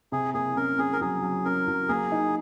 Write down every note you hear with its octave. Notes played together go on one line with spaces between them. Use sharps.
C3 G#4
A#3 G#4
C#4 A#4
C#4 G#4
A#4
F#3 G#4
F#3
C#4 A#4
F#3
A#3 G#4
D#4